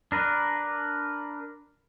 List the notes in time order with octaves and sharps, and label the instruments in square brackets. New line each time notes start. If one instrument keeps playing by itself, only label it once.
[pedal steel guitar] D4 A#4 B4